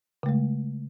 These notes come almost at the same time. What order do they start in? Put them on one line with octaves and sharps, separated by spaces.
C#3 A3 G#3